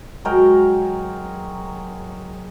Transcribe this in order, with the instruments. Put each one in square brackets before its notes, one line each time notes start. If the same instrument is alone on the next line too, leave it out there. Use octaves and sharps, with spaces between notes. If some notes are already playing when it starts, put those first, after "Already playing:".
[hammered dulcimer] F#3 G#3 A#4 G5